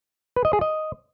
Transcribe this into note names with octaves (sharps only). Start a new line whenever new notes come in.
B4
D#5
G#4
D#5